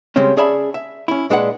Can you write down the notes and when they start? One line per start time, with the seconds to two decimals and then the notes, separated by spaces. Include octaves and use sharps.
0.16 C#3 G3 G#3 C4 C#4
0.37 C#4 G#4 D5 E5 A5 B5
0.74 E5
1.08 C#4 E4
1.30 A#2 G#3 D4 B4 C5 F#5